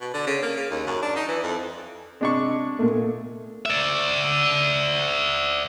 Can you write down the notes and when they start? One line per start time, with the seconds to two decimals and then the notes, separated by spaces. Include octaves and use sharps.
0.01 B2
0.14 D3
0.27 C#3
0.42 A#3
0.57 C#3
0.70 D#2
0.87 F#2
1.02 D4
1.16 D#4
1.28 E3
1.43 F2
2.21 C3 G#3 D4 C#6
2.79 A#2 A3
3.66 D5 E5